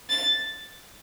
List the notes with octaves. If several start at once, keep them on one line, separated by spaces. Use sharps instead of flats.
A6